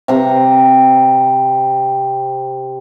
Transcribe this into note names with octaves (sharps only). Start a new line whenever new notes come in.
C3 A#5